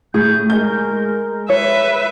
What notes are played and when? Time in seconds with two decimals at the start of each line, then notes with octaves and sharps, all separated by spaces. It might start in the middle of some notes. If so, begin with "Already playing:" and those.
0.14 A2 G#4 G6
0.50 G#3 A#4 G6
1.50 B4 C#5 E5